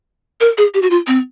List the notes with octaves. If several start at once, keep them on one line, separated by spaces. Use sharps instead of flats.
A#4
G#4
G4
F#4
F4
C4